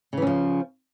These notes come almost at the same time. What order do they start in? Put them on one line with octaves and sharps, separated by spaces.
C#3 E3 C#4 F3